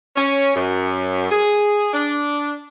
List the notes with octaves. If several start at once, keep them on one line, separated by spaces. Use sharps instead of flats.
C#4
F#2
G#4
D4